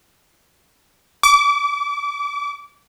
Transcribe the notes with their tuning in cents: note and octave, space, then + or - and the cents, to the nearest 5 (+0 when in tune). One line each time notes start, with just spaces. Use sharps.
D6 -30